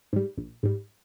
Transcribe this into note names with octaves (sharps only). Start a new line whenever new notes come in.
G#2 G3
A#1
G#2 G3